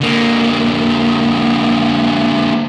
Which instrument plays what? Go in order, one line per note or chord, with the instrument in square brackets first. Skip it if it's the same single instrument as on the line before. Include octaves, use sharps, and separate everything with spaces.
[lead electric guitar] D3 A#3